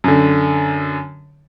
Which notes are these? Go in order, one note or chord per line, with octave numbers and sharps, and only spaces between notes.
F#2 D3